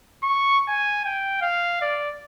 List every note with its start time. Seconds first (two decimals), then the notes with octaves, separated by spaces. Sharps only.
0.23 C#6
0.68 G#5
1.05 G5
1.42 F5
1.82 D5